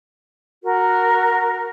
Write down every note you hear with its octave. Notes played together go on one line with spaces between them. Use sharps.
F#4 A#4